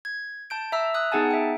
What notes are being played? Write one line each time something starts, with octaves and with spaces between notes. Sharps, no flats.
G#6
A5 G6 D7
E5 A#5 E6
D#6 F#6
B3 D#4 G#4 F#5 G#5 A5
E5 G5